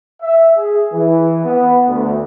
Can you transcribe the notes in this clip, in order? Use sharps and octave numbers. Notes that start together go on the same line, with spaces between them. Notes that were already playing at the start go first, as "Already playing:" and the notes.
E5
G#4
E3
B3
D2